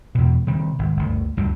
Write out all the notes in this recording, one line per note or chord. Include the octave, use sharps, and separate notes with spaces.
E2 B2
C3 D#3 G3
G#1
G1 D2
D2 G2 D3 G3